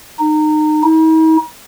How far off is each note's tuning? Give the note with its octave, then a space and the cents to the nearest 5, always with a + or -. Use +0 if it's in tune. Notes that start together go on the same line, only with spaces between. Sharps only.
D#4 -25
D#4 +45